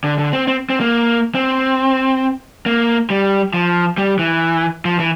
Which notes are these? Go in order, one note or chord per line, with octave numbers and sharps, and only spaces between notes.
D3
D3
C4
C4
C4
A#3
C4
A#3
G3
F3
G3
E3
F3
E3